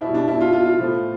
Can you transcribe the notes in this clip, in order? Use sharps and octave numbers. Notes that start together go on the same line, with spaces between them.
B2 G3 E4
D4
E4
F4
F4
F4
A2 F3 A3